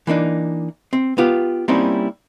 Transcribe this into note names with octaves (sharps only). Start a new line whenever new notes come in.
E3 A#3 D4 D#4
C4
B3 F4 G4
G3 A#3 C4 C#4 D#4 E4